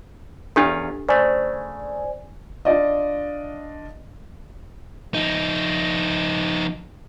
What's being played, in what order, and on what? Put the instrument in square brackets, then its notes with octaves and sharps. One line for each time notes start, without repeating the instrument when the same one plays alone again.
[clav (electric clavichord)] E2 C#4 F4 [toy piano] D4 G4 A4
[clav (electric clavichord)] C#3 A3 [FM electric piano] C5 D5 G#5
[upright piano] D4 F4 D5 D#5
[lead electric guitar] F3 D#4